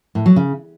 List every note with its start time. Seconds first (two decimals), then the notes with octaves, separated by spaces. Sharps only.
0.15 A2
0.26 F#3
0.36 C#3